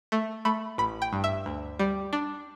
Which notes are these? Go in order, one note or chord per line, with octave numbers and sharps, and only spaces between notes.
A3
A3 B5
A1 B5
G5
G2
E5
D2
G3
D4